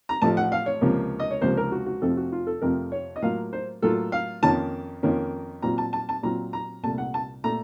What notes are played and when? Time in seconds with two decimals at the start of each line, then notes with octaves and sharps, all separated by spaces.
0.09 A#5
0.22 A1 A2 F3 A3 A5
0.37 F#5
0.52 F5
0.66 C#5
0.81 C#2 C3 F3 A#3
1.19 D#5
1.31 C#5
1.41 C#2 C3 F3 A#3 C5
1.57 A#4
1.72 F#4
1.86 F#4
2.01 F2 C3 F3 A3 C4 A4
2.17 F#4
2.32 F4
2.47 A4
2.62 F2 C3 F3 A3 C4 A#4
2.92 C#5
3.16 D#5
3.22 A2 F#3 A#3 F4 F5
3.53 C5
3.82 A2 F#3 A#3 F4 A4
4.12 F5
4.42 F2 D#3 A#3 C#4 F4 A5
5.03 F2 D#3 A#3 C#4 F4
5.62 A#2 F#3 C4 F4 A#5
5.78 A5
5.93 A5
6.09 A5
6.23 A#2 F#3 C4 F4 A#5
6.53 A#5
6.83 C2 A#2 A3 A5
6.98 F#5
7.14 A5
7.44 A#2 A3 A#5